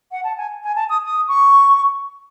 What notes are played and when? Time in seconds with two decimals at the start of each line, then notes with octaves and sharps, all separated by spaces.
0.11 F#5
0.23 A5
0.37 G#5
0.63 G#5
0.75 A5
0.89 D#6
1.05 D#6
1.28 C#6